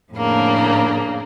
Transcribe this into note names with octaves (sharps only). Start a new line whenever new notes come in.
F2 A2 C#3 A#3 D4